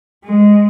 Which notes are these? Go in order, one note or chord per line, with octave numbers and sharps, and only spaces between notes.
G#3